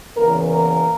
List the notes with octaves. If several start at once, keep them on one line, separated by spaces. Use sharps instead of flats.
E2 C#3 E3 A#3 A#4
A#3 A#4